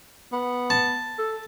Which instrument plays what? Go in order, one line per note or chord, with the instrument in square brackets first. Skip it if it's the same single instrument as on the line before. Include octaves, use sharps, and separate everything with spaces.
[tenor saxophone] B3
[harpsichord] A5
[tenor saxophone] A4